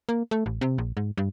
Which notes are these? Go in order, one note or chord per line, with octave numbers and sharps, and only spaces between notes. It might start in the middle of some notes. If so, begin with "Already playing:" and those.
A#3
A3
A1
C3
A#1
G#2
G2